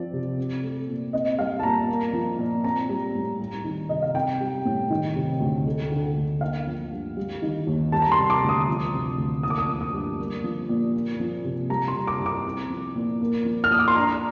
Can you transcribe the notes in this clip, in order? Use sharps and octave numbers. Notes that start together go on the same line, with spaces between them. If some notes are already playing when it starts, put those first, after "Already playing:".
Already playing: F3 C4 D5
C3
C4
A3
A#2
C4 D#5
G3 F5
A5
A#2 A#5
A#3
F3
A#2
C4 A#5
G3
A2
G3
D#3
C3 D#5
F5
C4 G5
G3
A2
D#3
C3
D2
A3
D3
D2
A#3 F5
F3
G2
G3
D#3
D#2
G3 A5
A#5
C6
C3
D6
D2
D#6
F3
C3
D2
A#3 D#6
D6
D#6
F3
D#6
G2
A#3
F3
A#2
A#3
F3
C3
G3 A#5
C6
C3
D6
C2
D6
C4
F3
A#2
A#3
F3
F6
A#2 D#6
D6
C6
D4 A#5